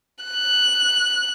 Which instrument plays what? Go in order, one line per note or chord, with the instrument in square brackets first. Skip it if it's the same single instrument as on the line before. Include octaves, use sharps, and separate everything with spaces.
[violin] F#6